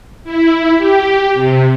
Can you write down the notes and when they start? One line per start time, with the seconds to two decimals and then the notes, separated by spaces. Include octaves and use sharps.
0.24 E4
0.77 G4
1.34 C3